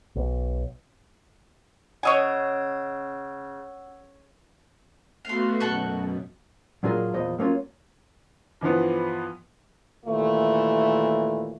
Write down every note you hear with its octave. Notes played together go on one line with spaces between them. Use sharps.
B1
C#3 C#5 D#5 F#5 G#5 E6
A3 B3 F#4 F5 C6
F#2 B2 A4 F#5 C#6
A#2 F#3 D4 F4 G#4 A#4
E2 A#2 F3 D#5
F#3 A#3 C#4 F4
G2 E3 F3 B3
D#2 A#2 E3 A3